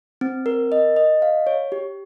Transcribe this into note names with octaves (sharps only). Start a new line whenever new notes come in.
C4
A#4
D#5
D#5
F5
C#5
G4